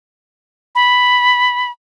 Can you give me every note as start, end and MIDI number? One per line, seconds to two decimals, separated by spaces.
0.75 1.71 83